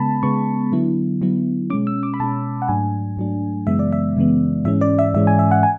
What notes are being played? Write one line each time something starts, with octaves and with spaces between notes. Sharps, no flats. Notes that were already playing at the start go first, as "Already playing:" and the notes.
Already playing: C#3 G#3 B3 A5 B5
C#3 G#3 B3 C#6
D3 F#3 B3 E4
D3 F#3 B3 E4
B2 G#3 C#4 D6
E6
D6
B5
B2 G#3 C#4 A5
F#5
G#2 F#3 A3 D4 G#5
G#2 F#3 A3 D4
F#2 C#3 E3 G#3 B3 E5
D5
E5
F#2 C#3 E3 G#3 B3
G#2 E3 G#3 C#4 E5
D5
E5
G#2 E3 G#3 C#4 E5
G#5
E5
F#5
G#5